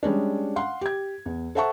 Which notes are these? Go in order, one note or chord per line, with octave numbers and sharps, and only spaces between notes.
G3 G#3 C#4 D4
F5 F#5 C6
G4 G#6
E2
A4 C5 E5 F#5 A5 C#6